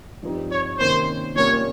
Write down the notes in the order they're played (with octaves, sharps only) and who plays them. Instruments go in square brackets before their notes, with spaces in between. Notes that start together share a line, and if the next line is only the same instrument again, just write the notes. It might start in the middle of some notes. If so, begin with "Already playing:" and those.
[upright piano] G2 F3 C4 D#4 G4
[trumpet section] C#5
[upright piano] C3 D#3 A#3 C#4 [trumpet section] C5
[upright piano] C3 G3 A#3 C#4 F4 [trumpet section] C#5